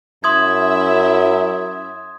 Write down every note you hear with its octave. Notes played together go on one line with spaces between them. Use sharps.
F#2 E4 E5 C6 D#6 G#6